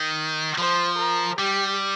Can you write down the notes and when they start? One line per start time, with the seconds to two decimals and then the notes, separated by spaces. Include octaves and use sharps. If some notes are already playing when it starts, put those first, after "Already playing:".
Already playing: D#3
0.58 F3 C5
0.98 A#4
1.39 G3 G4